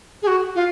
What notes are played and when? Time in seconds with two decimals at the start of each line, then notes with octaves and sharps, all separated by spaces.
0.22 G#4
0.27 F#4
0.55 F4